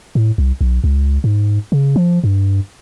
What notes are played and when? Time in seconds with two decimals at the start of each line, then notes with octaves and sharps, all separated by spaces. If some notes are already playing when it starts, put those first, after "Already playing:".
0.15 A2
0.38 C2
0.61 B1
0.84 C#2
1.24 G#2
1.72 C#3
1.96 F3
2.24 G2